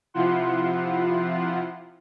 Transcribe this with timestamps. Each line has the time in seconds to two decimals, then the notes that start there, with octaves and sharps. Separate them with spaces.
0.14 C3 F3 E4 F4 F#5 C6